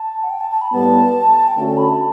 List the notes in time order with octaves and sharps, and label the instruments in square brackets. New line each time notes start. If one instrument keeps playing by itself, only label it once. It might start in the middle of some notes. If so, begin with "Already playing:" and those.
Already playing: [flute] A5
F#5
G5
A5
A5
B5
[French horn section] A2 G3 B3 [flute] A5
[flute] G5
[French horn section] D3 A3 C#4 F#4 A4 [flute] A5
[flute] A5
B5
A5